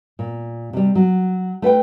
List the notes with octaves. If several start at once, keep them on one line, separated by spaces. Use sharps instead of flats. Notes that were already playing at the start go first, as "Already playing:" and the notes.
A#2
C3 G3
F#3
A3 B4 F#5 G5